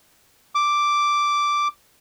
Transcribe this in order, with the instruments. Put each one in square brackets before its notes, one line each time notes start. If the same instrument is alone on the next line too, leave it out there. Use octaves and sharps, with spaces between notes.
[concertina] D6